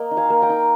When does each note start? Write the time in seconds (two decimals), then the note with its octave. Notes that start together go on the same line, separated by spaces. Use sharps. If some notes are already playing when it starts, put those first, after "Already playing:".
Already playing: A#3 D#5
0.11 D#4
0.17 F5 G#5
0.30 A#3
0.42 G5 A#5
0.49 D#4